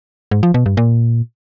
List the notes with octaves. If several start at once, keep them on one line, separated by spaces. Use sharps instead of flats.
G#2
F3
B2
G2
A#2